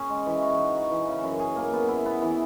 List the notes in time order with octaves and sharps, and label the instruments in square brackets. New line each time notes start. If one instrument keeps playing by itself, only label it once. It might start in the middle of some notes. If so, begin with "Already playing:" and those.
Already playing: [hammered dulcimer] C#4 G#4
G#3
E3
F#4
D#4
F#4
E3
C#3
F#2
G#4
A#3
B3
E4
B3
E3